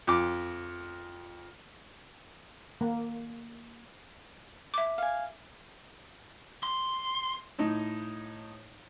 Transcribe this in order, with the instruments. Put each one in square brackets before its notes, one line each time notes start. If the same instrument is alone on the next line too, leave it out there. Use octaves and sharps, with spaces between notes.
[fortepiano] F2 D6
[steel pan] A#3
[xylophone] E5 D6
[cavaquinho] F5 G#5
[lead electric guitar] C6
[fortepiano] A2 D#4